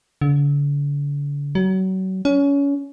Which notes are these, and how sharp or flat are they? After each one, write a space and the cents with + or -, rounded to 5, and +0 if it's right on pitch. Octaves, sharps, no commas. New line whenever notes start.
D3 -40
F#3 +30
C#4 +25